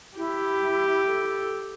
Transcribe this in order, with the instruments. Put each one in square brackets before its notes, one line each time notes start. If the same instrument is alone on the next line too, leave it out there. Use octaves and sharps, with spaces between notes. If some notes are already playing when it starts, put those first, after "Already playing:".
[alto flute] E4 [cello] G4
[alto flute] A4